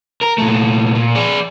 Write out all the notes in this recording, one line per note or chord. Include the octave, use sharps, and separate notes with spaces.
A#4
A#2 A3
A#2
G#4 D5